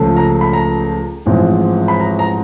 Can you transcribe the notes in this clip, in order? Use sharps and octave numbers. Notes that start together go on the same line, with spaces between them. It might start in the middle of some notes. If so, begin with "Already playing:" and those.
Already playing: C#2 C#3 F3 A3
A#5
B5
A#5
A1 G#2 F3 G#3 C4
B5
A#5
A#5